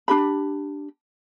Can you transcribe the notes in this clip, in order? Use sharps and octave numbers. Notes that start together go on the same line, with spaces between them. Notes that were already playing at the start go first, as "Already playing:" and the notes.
D4 G4 B5